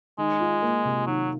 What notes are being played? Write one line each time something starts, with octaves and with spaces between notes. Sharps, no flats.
D#3 G#3
F4
A#3
C3
D#3 F#3